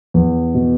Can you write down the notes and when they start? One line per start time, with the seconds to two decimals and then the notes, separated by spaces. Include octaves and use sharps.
0.14 E2
0.55 B2